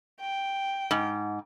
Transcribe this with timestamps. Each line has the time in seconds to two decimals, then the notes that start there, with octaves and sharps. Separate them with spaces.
0.20 G5
0.91 G#2